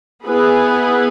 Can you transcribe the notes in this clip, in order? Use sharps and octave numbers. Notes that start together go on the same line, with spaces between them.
B3 E4 G#4 B4